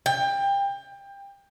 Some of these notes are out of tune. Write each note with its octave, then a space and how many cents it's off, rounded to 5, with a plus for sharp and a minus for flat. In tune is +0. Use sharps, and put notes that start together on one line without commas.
G5 +25